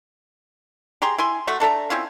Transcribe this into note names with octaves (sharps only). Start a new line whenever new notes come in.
G4 G#4 A#5 C6
E4 G#5 C6
A3 F#4 E5 F#5
D4 A4 E5 A#5
C4 C#4 E4 F4